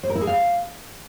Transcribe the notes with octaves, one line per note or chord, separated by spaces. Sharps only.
C5
A#4
E4
G#4
F5